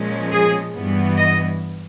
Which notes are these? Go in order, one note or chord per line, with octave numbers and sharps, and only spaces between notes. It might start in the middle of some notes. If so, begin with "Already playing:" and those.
Already playing: A#2 F3 G#3 C#4
G#4
G2 E3 G3 B3
D#5